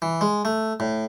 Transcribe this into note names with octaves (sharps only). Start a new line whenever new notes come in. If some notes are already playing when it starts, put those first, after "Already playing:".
E3
G#3
A3
A2